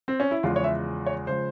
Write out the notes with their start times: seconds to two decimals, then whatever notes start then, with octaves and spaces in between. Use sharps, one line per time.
0.08 C4
0.20 C#4
0.31 E4
0.43 E2 C#3 F3 G#3 F4
0.56 C#5
0.64 E5
1.06 C#5
1.27 C#3 F3 G#3 C5